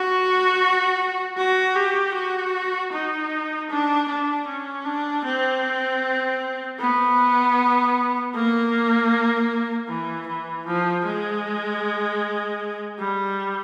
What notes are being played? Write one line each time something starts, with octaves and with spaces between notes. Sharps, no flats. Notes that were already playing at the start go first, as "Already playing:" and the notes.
Already playing: F#4
F#4
G4
F#4
D#4
D4
D4
C#4
D4
C4
B3
A#3
E3
E3
F3
G#3
G3